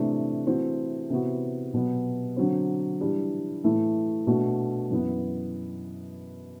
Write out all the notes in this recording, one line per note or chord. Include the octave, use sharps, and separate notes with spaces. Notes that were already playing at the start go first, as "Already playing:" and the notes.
Already playing: C3 E3 A3 D4
E3 A3 C4 F#4
C3 E3 B3 F#4
B2 F#3 B3
D3 F#3 C4
E3 G3 D4
A2 E3 A3 E4
B2 A3 D4 F#4
F#2 E3 B3